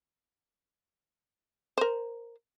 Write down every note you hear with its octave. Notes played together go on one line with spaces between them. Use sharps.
A#4 C5